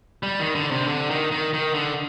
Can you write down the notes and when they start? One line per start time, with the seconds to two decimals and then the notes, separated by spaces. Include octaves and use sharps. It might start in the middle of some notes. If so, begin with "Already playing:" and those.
0.23 G3
0.40 D#3
0.55 D3
0.71 C3
0.87 D3
1.10 D#3
1.31 D#3
1.53 D#3
1.74 D3